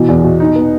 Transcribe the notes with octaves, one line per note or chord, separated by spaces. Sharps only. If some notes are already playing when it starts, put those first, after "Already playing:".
Already playing: B2 E3
E2
B2
D#4
B3